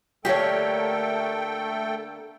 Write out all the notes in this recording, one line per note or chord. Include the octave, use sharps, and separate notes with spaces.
D3 A3 A#3 G4 A4 C#5 G5